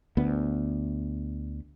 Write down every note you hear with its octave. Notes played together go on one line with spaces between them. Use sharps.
D2 B3